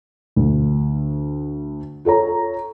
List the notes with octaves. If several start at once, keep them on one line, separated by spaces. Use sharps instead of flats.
D2
F4 A4 C#5 A#5